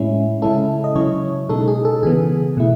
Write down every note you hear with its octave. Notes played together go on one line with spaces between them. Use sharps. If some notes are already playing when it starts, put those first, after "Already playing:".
Already playing: A2 G#3 C#4 E4
C#3 G#3 C#4 E4 A4
D#5
C#3 F#3 C#4 E4 C#5
B2 G#3 D#4 A4
G#4
A4
C#3 E3 B3 G#4
B2 A3 E4